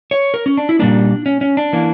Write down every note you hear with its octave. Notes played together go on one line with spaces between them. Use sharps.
C#5
A#4
C#4
D4
E4
A#2 G3 A#3 D4
C#4
C#4
D4
E3 A#3